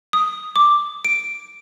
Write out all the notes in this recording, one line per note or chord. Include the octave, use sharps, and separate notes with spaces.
D#6
D6
D7